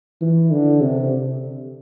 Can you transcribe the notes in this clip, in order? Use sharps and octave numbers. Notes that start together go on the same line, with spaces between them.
E3
D3
C3